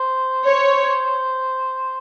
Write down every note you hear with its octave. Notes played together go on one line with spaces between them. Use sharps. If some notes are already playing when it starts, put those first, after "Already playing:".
Already playing: C5
C#5